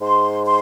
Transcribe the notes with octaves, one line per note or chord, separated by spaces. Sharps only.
G#2 C6
C6